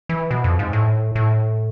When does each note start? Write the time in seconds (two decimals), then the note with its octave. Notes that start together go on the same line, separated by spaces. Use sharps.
0.09 E3
0.31 B2
0.44 F2
0.59 G#2
0.73 A2
1.15 A2